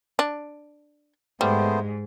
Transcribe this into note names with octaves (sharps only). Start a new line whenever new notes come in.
D4
G#2 G3 A3 B3 C5